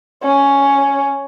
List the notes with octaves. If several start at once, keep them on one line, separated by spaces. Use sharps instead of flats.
C#4